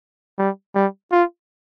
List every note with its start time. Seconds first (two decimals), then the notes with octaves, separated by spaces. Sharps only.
0.38 G3
0.75 G3
1.12 F4